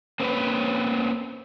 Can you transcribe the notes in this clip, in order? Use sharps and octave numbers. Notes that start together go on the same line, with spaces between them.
A#3 C4 C#4 F4 B4